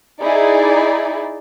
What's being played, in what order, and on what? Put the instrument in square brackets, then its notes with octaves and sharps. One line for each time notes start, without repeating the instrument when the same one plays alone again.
[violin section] D#4 E4 G#4 D5